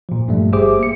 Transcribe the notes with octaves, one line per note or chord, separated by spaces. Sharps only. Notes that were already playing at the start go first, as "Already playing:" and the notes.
A#2 F3
G2 G3 A3
G1 G4 G#4 C5 E5 D6
A#3 C#7